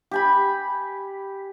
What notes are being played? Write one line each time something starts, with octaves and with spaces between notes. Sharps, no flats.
G4 G#5 B5